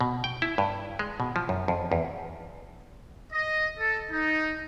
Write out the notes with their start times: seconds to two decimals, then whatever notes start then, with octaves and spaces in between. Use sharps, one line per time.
0.01 B2
0.24 G5
0.42 E4
0.58 G2
0.99 G#3
1.20 B2
1.36 F3
1.49 F#2
1.68 F2
1.92 E2
3.32 D#5
3.78 A4
4.10 D#4